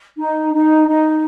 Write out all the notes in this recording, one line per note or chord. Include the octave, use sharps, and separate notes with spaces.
D#4
D#4
D#4